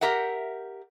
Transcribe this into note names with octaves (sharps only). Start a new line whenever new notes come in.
G4 A#4 E5 F#5